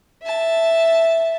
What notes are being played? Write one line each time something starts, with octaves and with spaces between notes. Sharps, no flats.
E5 A5